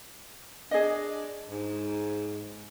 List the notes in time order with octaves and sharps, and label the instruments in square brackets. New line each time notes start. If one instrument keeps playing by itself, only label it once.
[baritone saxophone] D4 [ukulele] G#4 D#5
[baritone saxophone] G#2